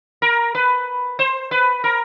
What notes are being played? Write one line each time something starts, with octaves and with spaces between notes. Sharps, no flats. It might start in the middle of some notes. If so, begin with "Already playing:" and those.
A#4
B4
C5
B4
A#4